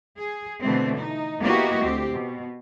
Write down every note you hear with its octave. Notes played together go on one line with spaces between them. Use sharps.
G#4
B2 D3 E3 A3 C4
D#4
A#3 B3 E4 F#4 G4 D#5
D2 C4 G4
B2